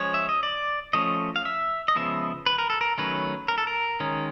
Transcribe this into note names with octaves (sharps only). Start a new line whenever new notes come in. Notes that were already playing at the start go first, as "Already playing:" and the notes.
Already playing: F3 G#3 C#4 C#5
E5
D#5
D5
F3 A3 C#4 D#5
F5
E5
D#5
C#3 F3 G#3 B3 E5
B4
A#4
A4
A#4
D#3 F#3 A3 C#4 B4
A#4
A4
A#4
D#3 G#3 C#4